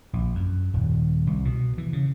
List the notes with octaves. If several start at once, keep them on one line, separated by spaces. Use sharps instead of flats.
A#1
F#2
D#1
C2
B2
E3
C#3